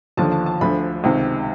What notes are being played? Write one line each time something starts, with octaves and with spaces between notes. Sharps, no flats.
D#2 D3 F3 A5
A5
A5
D2 D3 F3 B5
C#2 C3 D#3